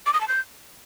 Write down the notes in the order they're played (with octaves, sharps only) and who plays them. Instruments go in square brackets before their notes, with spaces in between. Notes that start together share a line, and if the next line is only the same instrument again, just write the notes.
[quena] D6
D#6
A5
G6